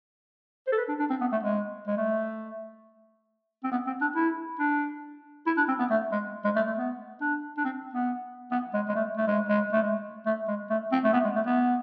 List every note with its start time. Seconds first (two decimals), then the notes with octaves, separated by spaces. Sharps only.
0.67 C5
0.72 A4
0.78 B4
0.89 D4
0.99 D4
1.10 C4
1.21 B3
1.32 A3
1.43 G#3
1.87 G#3
1.98 A3
3.64 C4
3.72 B3
3.87 C4
4.01 D4
4.16 E4
4.59 D4
5.46 E4
5.57 D4
5.68 C4
5.79 B3
5.90 A3
6.12 G#3
6.45 G#3
6.56 A3
6.67 A3
6.78 B3
7.21 D4
7.58 D4
7.65 C4
7.94 B3
8.51 B3
8.74 G#3
8.89 G#3
8.96 A3
9.17 A3
9.28 G#3
9.49 G#3
9.73 A3
9.82 G#3
10.26 A3
10.48 G#3
10.70 A3
10.92 C4
11.04 A3
11.13 B3
11.25 G#3
11.35 A3
11.46 B3